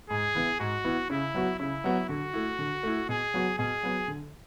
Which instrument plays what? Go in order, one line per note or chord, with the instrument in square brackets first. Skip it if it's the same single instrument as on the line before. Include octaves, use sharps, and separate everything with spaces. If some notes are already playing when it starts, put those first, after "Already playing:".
[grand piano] G#2 [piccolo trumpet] G#4
[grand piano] E3 B3 E4
[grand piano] G#2 [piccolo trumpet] F#4
[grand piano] E3 B3 E4
[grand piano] C#3 [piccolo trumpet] E4
[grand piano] F#3 B3 F#4
[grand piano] C#3 [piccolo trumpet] E4
[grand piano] F#3 B3 F#4
[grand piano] D3 [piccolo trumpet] F#4
[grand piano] A3 E4
D3
A3 E4
[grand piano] B2 [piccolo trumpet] G#4
[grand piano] F#3 B3 F#4
[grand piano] B2 [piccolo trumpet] G#4
[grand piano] F#3 B3 F#4
D3